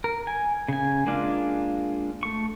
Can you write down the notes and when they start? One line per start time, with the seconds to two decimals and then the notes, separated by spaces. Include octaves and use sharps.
0.04 A#4
0.27 G#5
0.68 C#3 G#5
1.06 G#3 A#3 D4 F4
2.23 A3 C#6